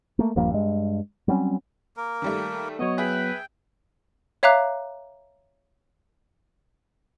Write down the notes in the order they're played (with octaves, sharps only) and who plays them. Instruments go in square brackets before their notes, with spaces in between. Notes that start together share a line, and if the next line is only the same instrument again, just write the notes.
[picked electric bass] A3 A#3
D#1 G2 F3 A#3
G2 G#3
F#3 G3 C4 C#4
[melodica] A#3 A#4
[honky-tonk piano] D#3 G3 A3
[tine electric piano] F#3 B3 [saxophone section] C#5 D#5
[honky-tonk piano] G#4 E5 [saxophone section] B4 [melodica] G5
[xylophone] C#5 E5 F5 A#5 D6 F#6